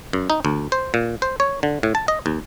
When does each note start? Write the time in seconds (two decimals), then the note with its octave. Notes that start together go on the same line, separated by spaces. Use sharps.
0.13 F#2
0.30 D#4
0.45 D2
0.72 C5
0.94 A#2
1.22 C5
1.40 C#5
1.63 D3
1.83 A2
1.95 A5
2.08 D#5
2.26 D#2